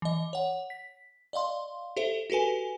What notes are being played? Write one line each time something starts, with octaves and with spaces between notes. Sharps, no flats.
E3 D#5
C#5 F#5
B6
D5 D#5 F5 C6
G4 A4 C5 E5
F#4 G4 A4 B4 G#5